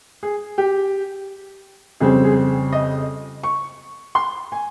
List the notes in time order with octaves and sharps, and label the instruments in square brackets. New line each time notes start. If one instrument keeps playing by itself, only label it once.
[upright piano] G#4
G4
F2 C#3 G3 C4 G#4
G#4
D#5
C#6
C6
G#5